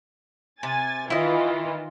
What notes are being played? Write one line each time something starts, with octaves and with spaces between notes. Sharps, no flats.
C3 G#5 A6
D#3 E3 E4 F4 D#5